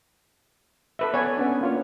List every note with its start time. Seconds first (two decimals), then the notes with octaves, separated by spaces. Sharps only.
0.99 A4 B4 E5
1.14 B3 C#5 D5 G#5
1.37 B3 C#4 D4
1.61 A#3 F4 C#5